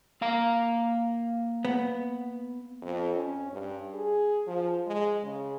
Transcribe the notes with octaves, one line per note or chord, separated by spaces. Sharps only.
A#3 F5 A#5
B3
F2
C#4
G2
G#4
F3
G#3
C#3